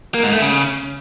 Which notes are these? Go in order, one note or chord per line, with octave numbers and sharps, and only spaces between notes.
A#3
G#2
A3
C#3